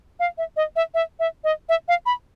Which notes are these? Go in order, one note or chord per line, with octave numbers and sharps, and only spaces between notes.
F5
E5
D#5
E5
E5
E5
D#5
E5
F5
B5